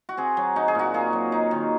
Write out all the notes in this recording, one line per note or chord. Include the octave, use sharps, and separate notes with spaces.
F#4
C4 G#4
F#3
D#4 F#4
G#4
A#2 F#4
A#3 G#4
F#3
D#4
D#3